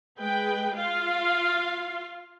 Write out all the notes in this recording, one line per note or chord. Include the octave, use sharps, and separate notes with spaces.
G#3 B4 G5
F4 F5